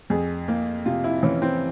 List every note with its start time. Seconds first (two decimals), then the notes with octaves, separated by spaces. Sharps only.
0.10 F2 G#4
0.48 A#3
0.85 C3 F4
1.04 E4
1.23 E3 C#4
1.42 C4